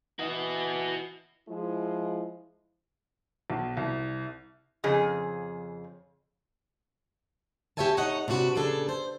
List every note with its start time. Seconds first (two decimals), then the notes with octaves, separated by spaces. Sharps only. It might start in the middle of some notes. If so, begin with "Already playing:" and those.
0.19 E3 F#4 D#5
1.48 F3 G#3 E4
3.50 B1
3.77 C2
4.84 F2 C#3 G#4
7.77 G4 A4 C#5 E5 G#5 A5
7.97 C3 D#4 C#5 D#5 F#5
8.28 C3 D4 E4 F#4 B4
8.55 A#2 C#3 D4 G#4 A4
8.89 C5